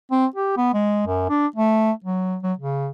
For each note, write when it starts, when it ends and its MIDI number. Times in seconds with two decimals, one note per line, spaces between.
0.11 0.26 60
0.36 0.54 67
0.57 0.72 59
0.74 1.02 56
1.07 1.28 42
1.29 1.47 62
1.56 1.91 57
2.04 2.37 54
2.43 2.53 54
2.59 2.90 49